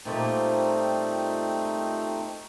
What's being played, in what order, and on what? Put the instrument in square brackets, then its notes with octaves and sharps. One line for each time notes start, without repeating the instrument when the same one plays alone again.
[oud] A#2 F3 G3 [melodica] A3 C4 D#4